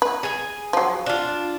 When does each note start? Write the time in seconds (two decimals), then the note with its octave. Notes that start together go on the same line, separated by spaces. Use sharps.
0.02 B4
0.23 G#4 G#5
0.73 F3 F#3
1.06 D4 F4